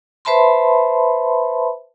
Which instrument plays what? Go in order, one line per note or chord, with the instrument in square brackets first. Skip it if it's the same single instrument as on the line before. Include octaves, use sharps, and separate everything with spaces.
[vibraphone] B4 C5 E5 A5 B5 C6